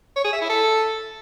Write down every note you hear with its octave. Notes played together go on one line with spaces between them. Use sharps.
C#5
G#4
E5
E4
A4